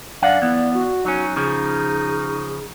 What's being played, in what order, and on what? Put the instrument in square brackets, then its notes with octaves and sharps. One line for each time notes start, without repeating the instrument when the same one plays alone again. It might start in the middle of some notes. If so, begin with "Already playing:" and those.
[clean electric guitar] F#2 D4 F#5 [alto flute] D5 [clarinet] F5
[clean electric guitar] E3 [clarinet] B3
[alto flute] F#4
[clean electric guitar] F#3 C#4 [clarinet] D#4
[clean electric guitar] C#3 F3 [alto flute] G#4